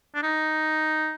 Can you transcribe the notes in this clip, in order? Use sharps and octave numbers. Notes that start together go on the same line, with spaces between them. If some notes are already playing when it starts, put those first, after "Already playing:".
D4
D#4